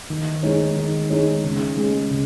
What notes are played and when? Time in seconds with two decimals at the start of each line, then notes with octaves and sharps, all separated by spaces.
0.10 D#3
0.43 G#3 D#4 G#4 C#5
0.76 D#3
1.10 G#3 D#4 G#4 C#5
1.44 C#3
1.77 G#3 C#4 G#4
2.11 C#3